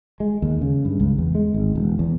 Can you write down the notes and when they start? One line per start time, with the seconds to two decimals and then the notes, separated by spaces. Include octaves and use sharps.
0.20 G#3
0.42 D#2
0.62 C#3
0.85 G2
1.00 C#2
1.18 E2
1.35 G#3
1.54 G#1
1.75 E1
1.99 E2